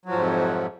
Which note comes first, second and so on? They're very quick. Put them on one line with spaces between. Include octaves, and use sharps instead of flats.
F#3 F3 G#2 F2 C3